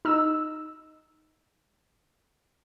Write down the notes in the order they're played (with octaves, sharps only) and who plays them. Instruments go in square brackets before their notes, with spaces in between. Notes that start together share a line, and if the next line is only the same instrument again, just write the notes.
[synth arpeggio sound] D#4 E6